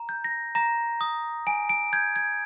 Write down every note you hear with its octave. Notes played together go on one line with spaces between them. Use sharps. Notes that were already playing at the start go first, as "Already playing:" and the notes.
Already playing: A#5
G6
A#6
A#5 A#6
D#6
G#5 D7
D7
G6 G#6
G#6